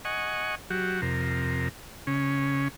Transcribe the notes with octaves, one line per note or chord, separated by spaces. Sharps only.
D#5 F#5 G#5 C#6
F#3 F#4 G4
F2 C3 A#4
C#3 C#4